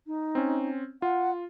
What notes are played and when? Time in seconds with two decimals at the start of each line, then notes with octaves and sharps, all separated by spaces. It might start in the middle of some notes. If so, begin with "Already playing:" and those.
0.07 D#4
0.35 C4 C#4
1.02 F4 F#5